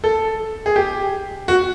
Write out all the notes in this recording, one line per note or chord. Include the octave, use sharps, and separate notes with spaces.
A4
G#4
G4
F#4